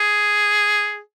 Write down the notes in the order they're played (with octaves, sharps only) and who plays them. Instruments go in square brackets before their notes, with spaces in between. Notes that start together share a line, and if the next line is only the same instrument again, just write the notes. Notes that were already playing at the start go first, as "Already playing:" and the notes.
Already playing: [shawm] G#4